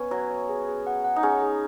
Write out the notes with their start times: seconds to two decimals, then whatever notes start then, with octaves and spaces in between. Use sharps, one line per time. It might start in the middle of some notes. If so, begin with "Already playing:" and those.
Already playing: B3 C#4
0.11 F#3 C#5
0.31 C#5
0.49 G#4
0.68 G#4
0.87 F#5
1.04 F#5
1.16 D#4
1.23 C#4 G#4
1.42 G#4